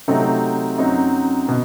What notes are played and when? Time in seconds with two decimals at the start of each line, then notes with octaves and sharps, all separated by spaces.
0.08 C3 F#3 A3 C4 D#4
0.78 F#2 F#3 C4 D#4
1.49 B2